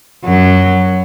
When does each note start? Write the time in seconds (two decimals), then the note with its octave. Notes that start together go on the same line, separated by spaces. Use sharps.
0.25 F#2 F#3